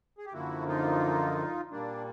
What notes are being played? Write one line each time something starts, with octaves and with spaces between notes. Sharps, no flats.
G#4
G4
F#2 D3 F3 A#3 E4 F#4
D#4 F4
A#2 G3 A#3 D4